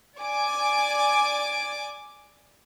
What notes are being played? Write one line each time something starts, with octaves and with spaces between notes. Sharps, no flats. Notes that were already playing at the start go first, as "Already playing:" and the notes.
D5 G#5 D6